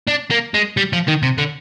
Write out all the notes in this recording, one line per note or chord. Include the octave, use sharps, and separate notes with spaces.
D4
A#3
G#3
G3
F3
D#3
C3
D3